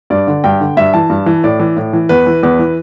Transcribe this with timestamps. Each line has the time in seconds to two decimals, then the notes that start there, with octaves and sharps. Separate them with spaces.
0.10 G2 D5
0.27 D3
0.44 G2 G5
0.60 D3
0.77 G2 E5
0.94 E3 A5
1.10 G2
1.26 E3
1.44 A2 D5
1.60 E3
1.77 A2
1.93 E3
2.09 E2 B4
2.26 E3
2.43 E2 B4
2.59 E3